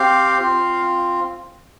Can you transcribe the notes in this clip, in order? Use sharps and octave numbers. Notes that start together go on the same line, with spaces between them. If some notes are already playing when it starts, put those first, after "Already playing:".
Already playing: C4 G4 F5
C4 F4